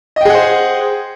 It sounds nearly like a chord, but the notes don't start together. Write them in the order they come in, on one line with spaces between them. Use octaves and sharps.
D#5 G5 G#4 F#5 C5